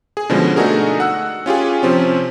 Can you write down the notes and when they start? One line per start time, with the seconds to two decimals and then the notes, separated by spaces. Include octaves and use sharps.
0.17 G#4
0.30 B2 D3 F3 G#3 C#4
0.56 A3 D4 D#4 F#4 G#4 A#4
1.00 F#5 E6 F#6
1.46 C#4 F4 G4 G#4
1.83 C3 F3 C4 C#4